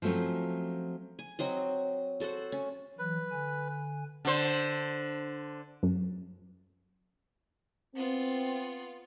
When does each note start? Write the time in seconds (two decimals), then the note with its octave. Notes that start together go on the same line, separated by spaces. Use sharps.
0.02 F3 F#3 A3 C4 C#4
1.19 G#5
1.39 F#3 C4 F#4 D#5
2.20 F#4 A4 C5 F#5
2.52 C#4
2.99 E3 F#3 B4
3.31 D3 G#5
4.25 D3 C5
5.83 F#2
7.96 B3 C4 F4